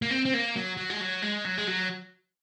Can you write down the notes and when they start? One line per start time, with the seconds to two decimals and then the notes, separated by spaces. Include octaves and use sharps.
0.02 A#3
0.10 C4
0.25 C4
0.34 A#3
0.56 F#3
0.77 F#3
0.90 G#3
1.01 F#3
1.22 G#3
1.45 F#3
1.58 G#3
1.67 F#3